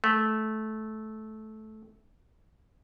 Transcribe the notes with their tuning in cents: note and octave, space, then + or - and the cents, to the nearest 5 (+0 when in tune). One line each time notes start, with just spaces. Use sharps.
A3 -15